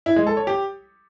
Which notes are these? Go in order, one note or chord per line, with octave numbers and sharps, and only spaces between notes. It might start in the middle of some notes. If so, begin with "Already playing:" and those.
E4
G#3
A4
C#5
G4